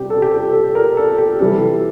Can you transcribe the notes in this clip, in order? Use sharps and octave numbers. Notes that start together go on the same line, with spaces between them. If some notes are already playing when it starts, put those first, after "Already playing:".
Already playing: C3 G3 G4
A4
G4
A4
A4
A#4
A4
G4
C3 E3 G3 A4